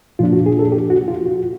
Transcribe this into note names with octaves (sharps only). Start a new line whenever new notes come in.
A#2 F3 A#3 D4 F4
F#4
G#4
A4
G4
F#4
F4
F#4